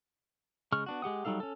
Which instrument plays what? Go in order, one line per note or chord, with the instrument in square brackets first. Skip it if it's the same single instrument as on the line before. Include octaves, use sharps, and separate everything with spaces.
[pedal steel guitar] C#3 G#3 C#6 F6
B3 D4 F#4
G#3 G4 F#5 D#6
F#3 G3 D#4 A4 F5
C#4 A4